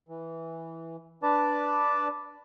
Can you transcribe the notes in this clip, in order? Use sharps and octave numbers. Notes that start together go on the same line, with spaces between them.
E3
D4 B4 D5 A5 D6